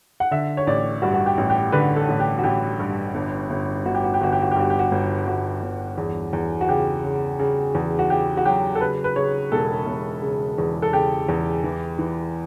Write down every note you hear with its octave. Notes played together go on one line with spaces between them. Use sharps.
F#5
D3 E5
C#5
A1 D5
G2 F#4
F#4
G4
A1
G4
D3 B4
A4
A1
G4
F#4
A1 G4
G2
G1
G1
G1 F#4
G4
F#4
G4
G1 F#4
G4
F#4
G4
G2 F#4
G4
F#4
G1
G1 F#4
G1
E2
E2
F#4
C#3 G4
C#3
C#3
E2
F#4
C#3 G4
F#4
F#3 G4
A4
C#3 B4
B4
C#3 C#5
E1 A4
E1
C#3
E2
A4
C#3 G4
E2
E3
E3